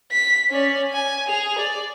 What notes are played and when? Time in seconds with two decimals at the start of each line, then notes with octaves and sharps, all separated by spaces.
0.12 B6
0.50 C#4 D5
0.93 G#5
1.27 G#4 F7
1.59 D5